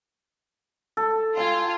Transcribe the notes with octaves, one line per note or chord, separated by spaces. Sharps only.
A4
F4 G5 G#5